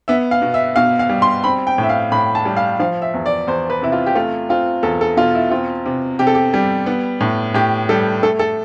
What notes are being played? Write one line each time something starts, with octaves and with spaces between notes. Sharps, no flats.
B3 E5
F5
B2
E5
B2 F5
F5
G3
C6
C4 B5
G5
A2
E5
F5
A2 B5
A5
G3
F5
F3 F5
E5
E2
D5
E2 C5
B4
C3 E4
F4
G4
A3 F4
C4 F4
E2 A4
A4
B2 F4
E4
C4 F4
C3
C3 G4
A4
G4
G3
B3
A2
A2 G4
G3 A4
A3 A4
A4